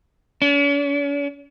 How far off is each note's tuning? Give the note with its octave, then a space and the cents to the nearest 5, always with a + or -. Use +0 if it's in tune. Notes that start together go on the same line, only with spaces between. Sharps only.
C#4 +45